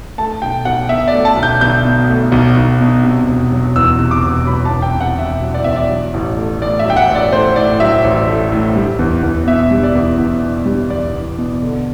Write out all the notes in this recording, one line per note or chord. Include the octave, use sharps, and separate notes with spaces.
A3 A5
B1 G5
B1 F#5
B2 E5
D5
A3
A5
B1
G6
B1 G6
B2
A3
B1
B1
B2
C3
E1
F#3
E2 E6
C3
D6
E1
F#3 B5
A5
E2
G5
C3
F#5
E1 E5
F#3
D5
E2 E5
D5
F#3
A1
A3
A2 D5
E5
F#3
G5
F#5
A1
D5
A3 C5
A2 D5
F#3 E5
A1
A3
A2
G3
E2
E2
B2 E5
G3
D5
E2
E2
B2
G3
E2 D5
E2
B2
D3